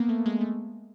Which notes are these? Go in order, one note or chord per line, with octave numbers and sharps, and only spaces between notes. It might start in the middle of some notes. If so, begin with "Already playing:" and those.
Already playing: A#3 B3
A3
G#3
A3